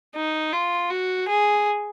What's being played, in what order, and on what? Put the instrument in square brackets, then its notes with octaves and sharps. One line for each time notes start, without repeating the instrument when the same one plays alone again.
[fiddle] D#4
F4
F#4
G#4